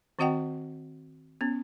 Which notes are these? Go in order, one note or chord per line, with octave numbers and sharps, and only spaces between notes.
D#3 C4 F#4 D#5 F#5 G5
B3 C#4